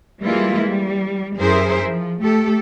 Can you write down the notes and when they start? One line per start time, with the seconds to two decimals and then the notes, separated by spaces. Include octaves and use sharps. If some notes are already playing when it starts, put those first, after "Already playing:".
0.23 E3 G3 G#3 A#3 E4 F4
0.63 G3
1.37 F#2 E4 G#4 A#4 C5 E5
1.84 F3
2.21 A3 G4 A4